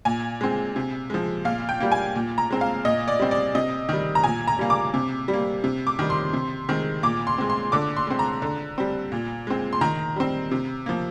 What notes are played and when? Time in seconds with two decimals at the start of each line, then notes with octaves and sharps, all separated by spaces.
0.05 A#2 G#5
0.41 G#3 C4
0.76 C3
1.10 F3 G#3
1.45 A#2 F5
1.69 G5
1.80 G3 A#3
1.92 G#5
2.15 A#2
2.38 A#5
2.50 G#3 C4
2.61 F5
2.85 A#2 D#5
3.08 D5
3.19 G3 C4
3.31 D5
3.55 C3 D#5
3.89 D#3 G3
4.15 A#5
4.24 A#2 G#5
4.47 A#5
4.59 G3 A#3
4.70 D6
4.94 C3
5.28 G3
5.33 A#3
5.64 C3
5.87 D6
5.99 D#3 G3
6.10 C6
6.33 C3
6.69 D#3 G#3 C4
7.03 A#2 D6
7.27 C6
7.38 G#3 C4
7.50 C6
7.72 D3 D6
7.97 C6
8.07 G#3 C4
8.19 A#5
8.42 D3
8.78 G3 C4
9.12 A#2
9.47 G#3 C4
9.73 C6
9.81 D#3 A#5
10.16 G3 C4
10.51 C3
10.86 F3 A#3